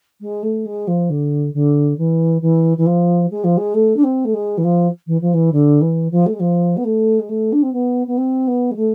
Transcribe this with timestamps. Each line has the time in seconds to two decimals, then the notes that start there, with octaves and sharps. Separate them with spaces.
0.21 G#3
0.43 A3
0.65 G#3
0.87 F3
1.10 D3
1.54 D3
1.98 E3
2.41 E3
2.77 E3
2.86 F3
3.31 G#3
3.44 F3
3.57 G#3
3.74 A3
3.96 D4
4.04 C4
4.25 A3
4.34 G#3
4.57 E3
4.64 F3
5.07 E3
5.21 F3
5.33 E3
5.52 D3
5.81 E3
6.11 F3
6.26 A3
6.33 G#3
6.40 F3
6.77 B3
6.84 A3
7.19 G#3
7.29 A3
7.52 D4
7.62 C4
7.73 B3
8.07 B3
8.17 C4
8.47 B3
8.71 G#3
8.76 A3